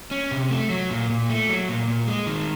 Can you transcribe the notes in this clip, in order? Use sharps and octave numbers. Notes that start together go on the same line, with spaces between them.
C#4
C3
A3
F#3
A#2
A#2
A3
F#3
A#2
A#2
G#3
D#3